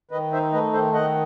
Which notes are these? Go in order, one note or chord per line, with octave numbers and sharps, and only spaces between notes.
D#3 B4 D#5
D#4 C5 E5
A3 B4 D#5
D#3 A4 C5
D#3 D#5 F#5